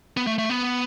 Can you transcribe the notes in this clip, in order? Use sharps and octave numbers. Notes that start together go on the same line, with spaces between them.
B3
A3
A3
B3